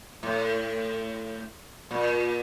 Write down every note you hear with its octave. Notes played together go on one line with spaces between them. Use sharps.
A2
A#2